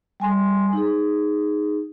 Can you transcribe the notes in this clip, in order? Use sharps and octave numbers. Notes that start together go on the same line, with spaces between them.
G3 G#5 C6
D#4 G#4